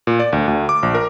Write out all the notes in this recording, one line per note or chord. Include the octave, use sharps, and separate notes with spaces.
A#2
D5
D2
D2
D6
A#1
A#4